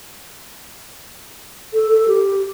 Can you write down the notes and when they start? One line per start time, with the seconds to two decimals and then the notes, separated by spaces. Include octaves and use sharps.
1.73 A4
1.91 A4
2.08 G4